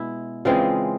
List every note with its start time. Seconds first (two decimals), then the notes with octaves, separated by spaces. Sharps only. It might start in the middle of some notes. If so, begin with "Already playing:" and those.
Already playing: B2 G#3 E4
0.45 C#3 E3 G#3 C4 F4